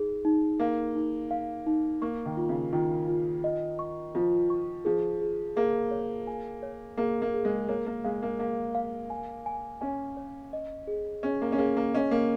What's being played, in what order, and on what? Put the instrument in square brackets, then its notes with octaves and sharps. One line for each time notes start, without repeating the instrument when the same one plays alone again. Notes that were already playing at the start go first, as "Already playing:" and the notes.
Already playing: [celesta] D#4 G#4
D#4
[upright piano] A#3 [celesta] F5
[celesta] D#4
F5
D#4
[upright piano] A#3 [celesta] C#6
[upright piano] D#3
[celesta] F4
[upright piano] C#3
[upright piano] D#3 [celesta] F4
[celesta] F4
D#5
C#6
[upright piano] F3 [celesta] F4
[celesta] C#6
[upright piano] F3 [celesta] G#4
[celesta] G#4
[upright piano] A#3 [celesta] G#4
[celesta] C#5
G#5
C#5
[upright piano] A#3 [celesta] G#4
[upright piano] A#3
[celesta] G#4
[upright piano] G#3
[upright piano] A#3 [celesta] C#5
[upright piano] A#3
[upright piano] G#3 [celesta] F5
[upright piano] A#3
[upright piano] A#3 [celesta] F5
[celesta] F5
G#5
G#5
[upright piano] C#4 [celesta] G#5
[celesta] C#5
D#5
G#4
[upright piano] C#4 [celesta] G#4
[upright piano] A#3
C#4
[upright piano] A#3 [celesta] G#4
[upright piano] A#3
[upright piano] C#4 [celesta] D#5
[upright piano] A#3